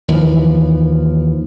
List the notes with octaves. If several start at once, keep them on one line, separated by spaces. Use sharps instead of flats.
D#2 E3 F3